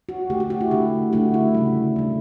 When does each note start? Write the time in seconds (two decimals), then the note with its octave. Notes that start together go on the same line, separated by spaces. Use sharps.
0.09 F#4
0.30 D3 A3 G4
0.40 G4
0.50 F#4
0.61 E4
0.71 D3 A3 G4
1.13 D3 A3 F#4
1.34 E4
1.55 C#3 G3
1.96 D3 A3